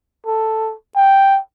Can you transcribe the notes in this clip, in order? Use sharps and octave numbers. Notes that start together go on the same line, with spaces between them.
A4
G5